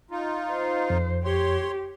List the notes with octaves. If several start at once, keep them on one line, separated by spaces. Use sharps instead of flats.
D#4 F4
C5
F2
G4 C#5 C6